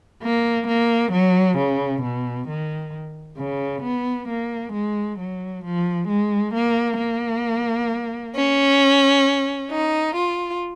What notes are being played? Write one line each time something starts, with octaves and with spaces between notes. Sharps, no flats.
A#3
A#3
F#3
C#3
B2
D#3
C#3
B3
A#3
G#3
F#3
F3
G#3
A#3
A#3
C#4
D#4
F4